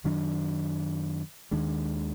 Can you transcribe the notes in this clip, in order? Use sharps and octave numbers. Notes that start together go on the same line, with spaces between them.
F#2 D#3 F#3 D4
D#2 D#3 G#3 D4